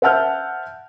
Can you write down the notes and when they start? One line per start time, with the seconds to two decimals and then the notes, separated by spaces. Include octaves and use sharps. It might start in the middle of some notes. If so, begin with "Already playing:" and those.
0.02 C5 E5 F#5 A5 F6 G6